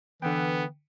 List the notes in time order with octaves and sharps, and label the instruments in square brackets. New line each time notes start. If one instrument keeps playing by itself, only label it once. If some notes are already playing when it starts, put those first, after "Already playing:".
[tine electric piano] D3 G5 [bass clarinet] E3 [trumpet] B3